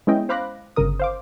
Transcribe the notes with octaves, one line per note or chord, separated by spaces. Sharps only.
G#3 B3 C#4 E4 D#5 G5
C5 F5 B5 D6 F#6 A#6
G1 C#3 A#4 D#6
C5 F5 D6